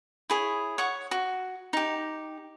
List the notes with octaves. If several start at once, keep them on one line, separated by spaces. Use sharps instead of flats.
E4 G#4 C#5
C#5 F#5 C#6
F#4
D#4 G4